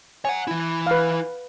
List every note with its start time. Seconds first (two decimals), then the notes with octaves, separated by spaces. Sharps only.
0.25 C#5 F#5 G#5
0.47 E3 E4
0.87 B4 F5